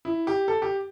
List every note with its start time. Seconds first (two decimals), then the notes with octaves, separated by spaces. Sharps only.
0.05 E4
0.27 G4
0.48 A4
0.62 G4